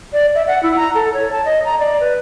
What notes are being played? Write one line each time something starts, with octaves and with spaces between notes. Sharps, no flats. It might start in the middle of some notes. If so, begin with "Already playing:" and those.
D5
E5
F#5
E4
A#5
A4
C#5
A5
D#5
A#5
D5
B4